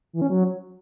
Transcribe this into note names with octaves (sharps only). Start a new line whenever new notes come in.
E3
C#4
F#3